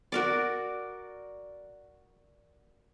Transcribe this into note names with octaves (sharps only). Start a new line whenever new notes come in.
F#4 A#4 D5